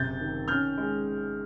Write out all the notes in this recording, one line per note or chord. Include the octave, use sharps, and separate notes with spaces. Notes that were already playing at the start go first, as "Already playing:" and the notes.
Already playing: F#1 C3 G6 A6
D#3
C#4 F6 G6
G#3